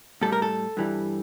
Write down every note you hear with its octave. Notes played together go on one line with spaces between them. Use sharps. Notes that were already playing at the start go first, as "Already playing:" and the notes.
A2 G3 A4
A#4
A4
G2 E3 G3